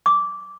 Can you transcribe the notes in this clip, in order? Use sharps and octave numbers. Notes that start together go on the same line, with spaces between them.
D6